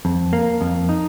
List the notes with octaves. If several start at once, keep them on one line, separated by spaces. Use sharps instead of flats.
F2
A#3
F2
D#4